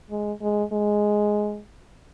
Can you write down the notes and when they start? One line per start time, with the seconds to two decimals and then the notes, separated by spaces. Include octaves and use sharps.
0.10 G#3
0.42 G#3
0.73 G#3